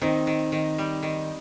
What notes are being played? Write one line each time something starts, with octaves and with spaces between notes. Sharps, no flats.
D#3 C4 D#4
D#3
D#3
G3
D#3